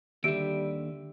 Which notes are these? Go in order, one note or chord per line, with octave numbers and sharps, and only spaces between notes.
D#2 D3 G3 G4 E5 D7